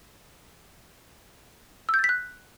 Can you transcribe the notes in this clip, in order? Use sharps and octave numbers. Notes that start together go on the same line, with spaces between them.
E6
G6
A6
B6
F#6